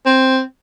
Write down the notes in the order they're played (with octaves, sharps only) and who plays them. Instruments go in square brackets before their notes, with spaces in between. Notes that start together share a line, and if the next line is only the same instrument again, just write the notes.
[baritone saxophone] C4